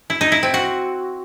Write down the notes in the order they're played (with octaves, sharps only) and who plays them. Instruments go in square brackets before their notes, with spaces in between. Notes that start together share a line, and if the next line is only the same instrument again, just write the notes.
[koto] E4
D#4
E4
C4
F#4